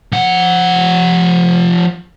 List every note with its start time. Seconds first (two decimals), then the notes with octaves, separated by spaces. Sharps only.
0.12 F3 F#5